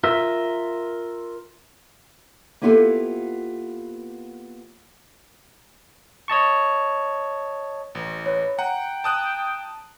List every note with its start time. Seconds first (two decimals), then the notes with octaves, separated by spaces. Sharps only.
0.04 F4 A#4 E5
2.61 A#3 B3 E4 F4 G4 A4
6.28 C#5 D#5 A5 C#6
7.95 A1
8.26 B4 C#5
8.59 F#5 G5 A#5
9.04 A5 D#6 F#6